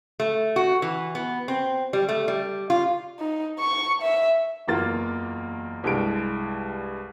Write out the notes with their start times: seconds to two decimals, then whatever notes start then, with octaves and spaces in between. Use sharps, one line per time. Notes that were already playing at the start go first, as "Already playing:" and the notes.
0.20 A3
0.56 F#4
0.82 E3
1.15 B3
1.48 C4
1.93 G3
2.09 A3
2.28 G3
2.70 F4
3.20 D#4
3.59 C#6
4.02 E5
4.68 F#1 E2 E3 A#3 F4 A6
5.84 C2 G2 G#3 D7